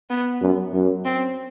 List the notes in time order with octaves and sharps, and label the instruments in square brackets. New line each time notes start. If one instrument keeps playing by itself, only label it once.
[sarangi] B3
[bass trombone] F#2
F#2
[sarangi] C4